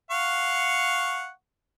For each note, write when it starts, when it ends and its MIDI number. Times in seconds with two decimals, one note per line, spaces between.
0.11 1.30 77
0.11 1.30 78
0.11 1.30 85